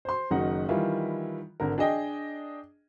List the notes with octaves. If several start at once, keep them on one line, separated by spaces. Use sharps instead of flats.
C5 C6
F#1 F#2 D#3 D#4 F#4 F#5
D#3 E3 G3 E4 F4
G#1 D3 A#4
D4 G#4 D#5 G5